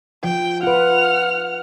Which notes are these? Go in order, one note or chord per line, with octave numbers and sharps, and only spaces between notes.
F3 G5
F4 B4 F#5 F6